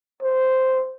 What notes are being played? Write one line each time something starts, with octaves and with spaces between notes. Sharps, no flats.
C5